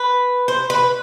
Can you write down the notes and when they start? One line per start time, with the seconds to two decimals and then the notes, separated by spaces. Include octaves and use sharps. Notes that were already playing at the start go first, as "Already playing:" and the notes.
Already playing: B4
0.48 C5
0.70 B4